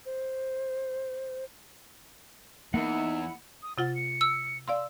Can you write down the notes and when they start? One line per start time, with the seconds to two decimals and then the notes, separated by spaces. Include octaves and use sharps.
0.05 C5
2.74 E2 A#3 D#4 E4 F#5
3.62 D#6
3.78 C3 F4 F#5 A6
3.95 C#7
4.21 E6
4.68 D5 F5 C6 E6